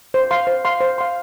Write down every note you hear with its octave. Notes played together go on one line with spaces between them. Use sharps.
C5
F5 C6
C5
F5 C6
C5
F5 C6